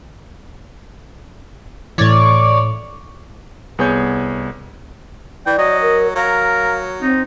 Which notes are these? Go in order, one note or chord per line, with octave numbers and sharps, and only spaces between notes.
A2 E3 C#5 D5
C2 B3 G#4 C#5 G6
E3 D5 G5
F#3 D#5
A#4
F#3 A#4 F5
C4 D#4